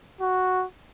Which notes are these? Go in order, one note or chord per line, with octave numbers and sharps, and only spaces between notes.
F#4